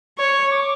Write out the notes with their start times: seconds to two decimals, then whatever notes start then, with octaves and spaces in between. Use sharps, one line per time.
0.18 C#5 C#6
0.52 D6